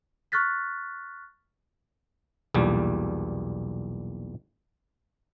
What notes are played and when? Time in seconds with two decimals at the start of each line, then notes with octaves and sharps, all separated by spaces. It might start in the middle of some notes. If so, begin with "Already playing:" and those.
0.32 C#6 F6 F#6 A6 B6
2.54 B1 E2 A#2 G3